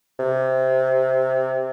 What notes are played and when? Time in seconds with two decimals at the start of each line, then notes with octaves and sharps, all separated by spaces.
0.19 C3